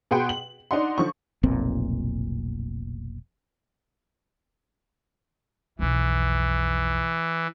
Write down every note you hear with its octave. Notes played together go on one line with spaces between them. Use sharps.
B2 G#4 B4 F#5 G5 C6
F#7
D4 D#4 D5 F#5 C6
D3 F3 C#6
F1 B1 A#2 C4
B1 F2 E3